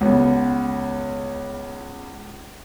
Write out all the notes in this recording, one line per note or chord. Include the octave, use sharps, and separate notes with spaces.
C#2 B3